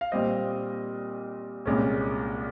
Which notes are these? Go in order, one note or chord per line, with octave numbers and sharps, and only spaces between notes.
F5
A#2 G3 C4 D#5
C2 A#2 G#3 C#4